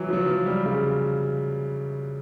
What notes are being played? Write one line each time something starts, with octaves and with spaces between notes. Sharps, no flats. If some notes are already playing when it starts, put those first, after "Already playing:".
Already playing: E3 F#3
F3
F#3
F3
G3
C#3